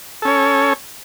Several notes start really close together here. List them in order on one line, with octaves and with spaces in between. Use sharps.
A4 C#4 C#5